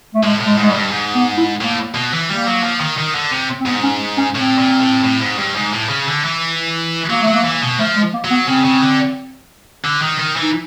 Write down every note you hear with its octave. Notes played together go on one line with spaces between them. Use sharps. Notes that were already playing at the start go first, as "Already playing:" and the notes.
A3
A2 G#3
A2
G#3
G#2
G#3
G3
G2
G#2
B3
E4
A2 A#3
B2
E3
G3 A#3
F#3
F3
D#3
D#3
D3
C3
C4
G#2 B3
C#4
C#4
A2 C4
A#2
A2
A2
G#2
G2
G#2
A2
C#3
D3
E3
F#3 A#3
A3
F#3
A#3
E3
B2
F3 A3
G#3
A#3
F#3
B3
C#3 C4
C#3
D3
D3
D#3
D#3
E3
D#4